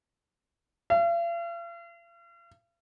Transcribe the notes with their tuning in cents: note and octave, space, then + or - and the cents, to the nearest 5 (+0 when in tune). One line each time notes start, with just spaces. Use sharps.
F5 -45